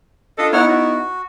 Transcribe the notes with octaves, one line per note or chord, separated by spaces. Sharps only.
D4 F4 A4 D#5
B3 D#4 E4 C#5 F#5 F6
F#4